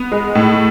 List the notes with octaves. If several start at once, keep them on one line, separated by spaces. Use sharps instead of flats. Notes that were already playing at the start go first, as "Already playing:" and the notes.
Already playing: B3
G#3
A2